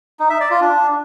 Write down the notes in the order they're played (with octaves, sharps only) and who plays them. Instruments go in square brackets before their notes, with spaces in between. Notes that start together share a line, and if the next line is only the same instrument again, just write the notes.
[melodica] D#4
E5
D5
F4
D4